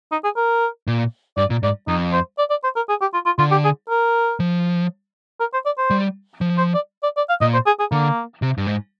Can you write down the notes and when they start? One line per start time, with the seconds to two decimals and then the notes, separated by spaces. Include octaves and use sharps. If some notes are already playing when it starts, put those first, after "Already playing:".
0.12 D#4
0.24 G#4
0.37 A#4
0.87 A#2
1.37 G2 D5
1.50 A#2
1.63 G#2 D5
1.88 F2 D#4
2.13 C5
2.38 D5
2.50 D5
2.64 C5
2.76 A#4
2.89 G#4
3.01 G4
3.14 F4
3.26 F4
3.39 D3 F4
3.51 G4
3.64 G#4
3.89 A#4
4.40 F3
5.40 A#4
5.53 C5
5.66 D5
5.78 C5
5.90 G3
6.41 F3
6.58 C5
6.74 D5
7.03 D5
7.17 D5
7.29 F5
7.41 A#2 D#5
7.54 C5
7.66 G#4
7.80 G#4
7.92 D3 A#3
8.42 C3
8.58 G2
8.67 G#2